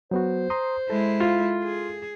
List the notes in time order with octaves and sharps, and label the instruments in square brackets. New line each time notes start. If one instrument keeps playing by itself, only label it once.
[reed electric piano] F#3 B3 F#4 [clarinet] C5
[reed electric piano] A#5 C6 D#6
[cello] G#3 E4 [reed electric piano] A4
[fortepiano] F4
[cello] G#4